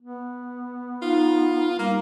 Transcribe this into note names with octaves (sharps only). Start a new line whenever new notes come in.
B3
D#4 F4
G3 A#3